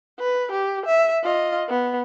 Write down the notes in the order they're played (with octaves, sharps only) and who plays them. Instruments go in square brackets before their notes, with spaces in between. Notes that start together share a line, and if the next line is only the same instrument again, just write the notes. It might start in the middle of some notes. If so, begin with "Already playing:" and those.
[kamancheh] B4
G4
E5
F4 D#5
B3